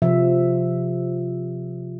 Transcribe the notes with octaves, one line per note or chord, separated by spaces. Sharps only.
C3 F3 E5